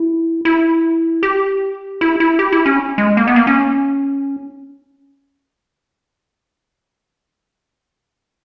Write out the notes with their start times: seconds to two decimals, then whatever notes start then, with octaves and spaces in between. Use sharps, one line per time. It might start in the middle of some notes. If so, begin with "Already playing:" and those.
Already playing: E4
0.45 E4
1.23 G4
2.01 E4
2.20 E4
2.39 G4
2.52 E4
2.66 C#4
2.98 G#3
3.17 A#3
3.27 B3
3.36 A#3
3.47 C#4